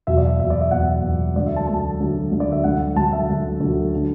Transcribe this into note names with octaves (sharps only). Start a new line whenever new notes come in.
E2 B2 F#3 E5
D5
E2 B2 F#3 E5
D5
E5
E2 B2 F#3 F#5
E2 B2 F#3
D2 D3 F#3 D5
E5
A5
D2 D3 F#3 A5
D2 D3 F#3
D2 D3 F#3
D5
E5
D2 D3 F#3 F#5
D2 D3 F#3 A5
E5
D2 D3 F#3
D2 D3 F#3
D3 F#3